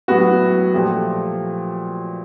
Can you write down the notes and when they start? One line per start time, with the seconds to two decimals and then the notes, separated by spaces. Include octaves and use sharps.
0.08 A2 F#3 B3 F#4
0.74 A#2 F3 A3 G4